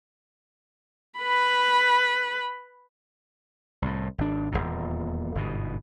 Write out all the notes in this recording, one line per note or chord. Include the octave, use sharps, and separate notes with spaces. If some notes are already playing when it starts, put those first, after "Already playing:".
B4 B5
C2 A2
G#1 D4
D#1 G#1 E2 A#2
G1 G#2 B2